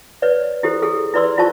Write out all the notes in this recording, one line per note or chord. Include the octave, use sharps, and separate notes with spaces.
B4 C#5 D5
E4 G4 A4 C5
G#4 A4
E4 B4 D5 C6 E6
E4 F4 C5 D5 A5 C#6